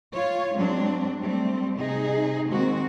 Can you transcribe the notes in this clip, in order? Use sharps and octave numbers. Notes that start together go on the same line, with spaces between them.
F4 C#5
F#3 G#3 C4 D4
G3 A3 C4
C3 D#4 G#4
D#3 G#3 A#3 C4 F#4